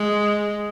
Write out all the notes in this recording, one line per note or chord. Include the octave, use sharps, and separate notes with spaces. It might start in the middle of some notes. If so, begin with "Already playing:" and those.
Already playing: G#3